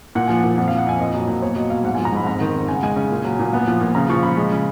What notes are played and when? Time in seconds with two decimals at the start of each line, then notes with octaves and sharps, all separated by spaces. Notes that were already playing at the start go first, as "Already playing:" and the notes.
0.15 A#2 F#5
0.28 F3 G#5
0.40 A#2 F#5
0.58 F2 F#5
0.68 F5
0.71 F3
0.78 F#5
0.86 F2 G#5
1.00 A#2 D#5
1.14 F#3
1.28 A#2
1.42 B2 C#5
1.56 F#3 D#5
1.70 B2 F5
1.84 G#2 F#5
1.95 G#5
1.98 F3
2.05 A#5
2.12 G#2 B5
2.27 F2 A#5
2.41 D#3
2.54 F2
2.68 C#3 G#5
2.76 F#5
2.83 G#3 G#5
2.96 C#3
3.11 A#2
3.24 F#3
3.39 A#2
3.53 B3
3.68 F3
3.81 A#2
3.95 C#3 A#5
4.09 F3 C#6
4.23 C#3 B5
4.37 G#3
4.52 C#3